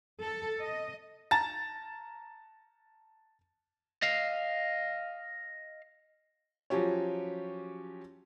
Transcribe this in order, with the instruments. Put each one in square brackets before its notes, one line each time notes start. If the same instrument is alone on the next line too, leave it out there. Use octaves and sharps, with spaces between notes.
[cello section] A4
D#5
[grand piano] A5 A#5 A6
[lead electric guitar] D#5 F5
[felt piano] F3 F#3 C#4 G4 C#5